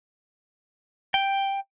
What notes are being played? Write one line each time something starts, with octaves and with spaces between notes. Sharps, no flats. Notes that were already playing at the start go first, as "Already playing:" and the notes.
G5